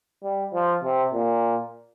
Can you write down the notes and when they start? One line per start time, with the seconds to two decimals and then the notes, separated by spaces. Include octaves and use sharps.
0.23 G3
0.53 F3
0.84 C3
1.14 A#2